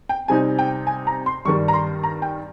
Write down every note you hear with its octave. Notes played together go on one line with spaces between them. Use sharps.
G5
C3 G3 C4 D#4 G#5
G5
G#5
A#5
C6
G2 D#3 G3 C#6
A#5
C6
A#5
G5